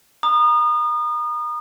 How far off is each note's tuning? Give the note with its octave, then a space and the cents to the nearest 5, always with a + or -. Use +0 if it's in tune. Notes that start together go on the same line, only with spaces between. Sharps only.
A#5 +25 D#6 -30